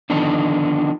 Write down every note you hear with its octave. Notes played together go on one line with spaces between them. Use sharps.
D3 D#3 F3 B3 D4 D#4